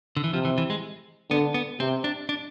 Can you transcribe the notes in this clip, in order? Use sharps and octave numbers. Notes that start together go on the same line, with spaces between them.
D3
E3
C3 F3
E3
E3
G#3
D3 B3
B3
C3 C4
D4
D4